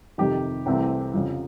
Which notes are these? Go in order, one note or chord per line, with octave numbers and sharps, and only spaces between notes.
F2 C3 D#3 G4
C2 C3 E3 A3 C4
F2 C#3 F3